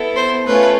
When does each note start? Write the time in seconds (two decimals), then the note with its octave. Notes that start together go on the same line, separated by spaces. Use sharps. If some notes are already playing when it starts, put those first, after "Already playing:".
Already playing: B3 E4 A4
0.16 C5
0.47 A3 C#4 F4 B4